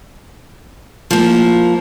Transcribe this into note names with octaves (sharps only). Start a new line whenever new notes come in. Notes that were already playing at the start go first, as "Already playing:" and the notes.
F3 A#3